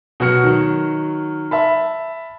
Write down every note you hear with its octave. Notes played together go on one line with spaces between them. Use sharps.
B2 F#3 F#4 F6 C#7
D#3 F#3
E5 A5 B5